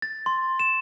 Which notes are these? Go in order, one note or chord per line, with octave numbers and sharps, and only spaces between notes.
A6
C6
E7